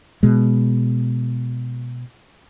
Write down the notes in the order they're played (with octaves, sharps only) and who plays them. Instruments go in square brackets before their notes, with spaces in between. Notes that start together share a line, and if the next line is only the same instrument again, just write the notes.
[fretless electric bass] B2 G#3